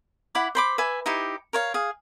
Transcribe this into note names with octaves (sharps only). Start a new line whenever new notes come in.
E4 F#5 B5 D6
C5 B5 D6
B4 E5 G#5
D#4 E4 G4
A#4 C#5 F5
G#4 F5